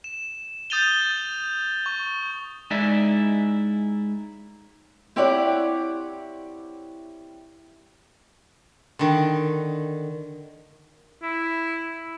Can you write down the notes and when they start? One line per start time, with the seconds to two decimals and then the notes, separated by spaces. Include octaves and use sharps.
0.04 E7
0.70 D#6 G6 A6 D#7 F7 G7
1.86 C#6
2.71 G#3 D#4 E4 D5 E5
5.16 C4 E4 G4 C#5 D5 F#5
8.99 D3 D#3
11.23 E4